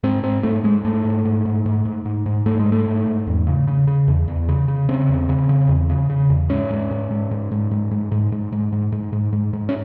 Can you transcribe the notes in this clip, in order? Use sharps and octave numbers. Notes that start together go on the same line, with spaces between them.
G#2 C4
G#2 C4
G#2 A3
G#2 G#3
G#2 A3
G#2
G#2
G#2
G#2
G#2
G#2
G#2
G#2 A3
G#3
G#2
A3
G#2
G#2
E2
C#3
C#3
C#3
E2
E2
C#3
C#3
C#3 C4
E2
C#3
C#3
E2
C#3
C#3
E2
G#2 C#4
G#2
G#2
G#2
G#2
G#2
G#2
G#2
G#2
G#2
G#2
G#2
G#2
G#2
G#2
G#2
C#4